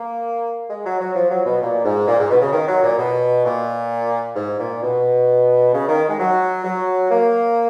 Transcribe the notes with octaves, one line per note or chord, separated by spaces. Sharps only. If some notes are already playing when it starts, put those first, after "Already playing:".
Already playing: A#3
G#3
F#3
F#3
F3
F#3
B2
A#2
G#2
A#2
G#2
B2
C#3
D#3
F#3
A#2
B2
A#2
G#2
A#2
B2
C#3
D#3
G#3
F#3
F#3
A#3